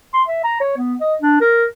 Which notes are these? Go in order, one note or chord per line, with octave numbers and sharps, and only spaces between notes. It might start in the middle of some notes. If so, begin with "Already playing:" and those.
C6
E5
A#5
C#5
B3
D#5
D4
A#4